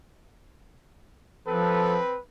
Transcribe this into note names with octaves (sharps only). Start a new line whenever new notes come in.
F3 C4 A4 B4